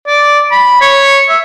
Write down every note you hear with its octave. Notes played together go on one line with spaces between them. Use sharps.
D5
B5
C#5
E5